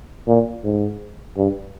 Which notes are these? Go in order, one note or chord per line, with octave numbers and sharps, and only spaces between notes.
A#2
G#2
G2